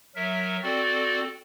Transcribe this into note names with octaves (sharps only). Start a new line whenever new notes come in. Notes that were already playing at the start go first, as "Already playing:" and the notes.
F#3 A#4 E5
C4 F#4 A4 D5